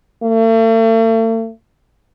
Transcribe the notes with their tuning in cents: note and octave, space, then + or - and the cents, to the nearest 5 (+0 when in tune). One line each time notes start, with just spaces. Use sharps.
A3 +45